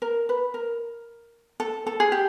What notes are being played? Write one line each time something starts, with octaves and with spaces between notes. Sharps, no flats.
A#4
B4
A#4
A4
A4
G#4
G4